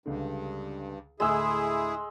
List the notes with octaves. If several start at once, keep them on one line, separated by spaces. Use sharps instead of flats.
C#2 G2 D3
D2 A2 G#3 E4 G#4 E6